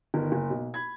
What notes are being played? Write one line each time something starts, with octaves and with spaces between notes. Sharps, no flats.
G1 D#3
F#1
B1
B5 G#6